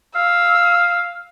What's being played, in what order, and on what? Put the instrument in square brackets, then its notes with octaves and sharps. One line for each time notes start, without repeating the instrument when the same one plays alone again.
[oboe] F5 [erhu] E6